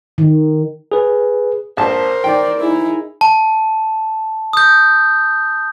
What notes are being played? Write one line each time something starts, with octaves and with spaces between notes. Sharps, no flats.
D#3
G#4 B4
A#1 A#4 C5 A5
D#4 D5 G5
D#4 E4 G#4
A5
D#6 G6